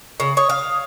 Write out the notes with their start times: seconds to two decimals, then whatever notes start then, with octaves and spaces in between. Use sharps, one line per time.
0.20 C#3
0.37 C#5 D#6
0.50 F5